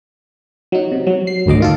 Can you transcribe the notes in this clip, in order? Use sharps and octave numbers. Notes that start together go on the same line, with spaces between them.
F#3 D#4
C3
F#3
C7
G#1 D2 F#3 D#5 D6
D#3 F4 A4